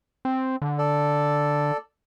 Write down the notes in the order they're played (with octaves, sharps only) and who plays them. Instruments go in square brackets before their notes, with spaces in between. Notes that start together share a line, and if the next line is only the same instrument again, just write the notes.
[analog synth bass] C4
D3
[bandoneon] A4 D5